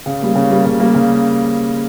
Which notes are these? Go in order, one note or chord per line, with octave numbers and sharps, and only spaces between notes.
C#3
G3 A#3
C#3
G3 A#3
C#3
G3 A#3
C#3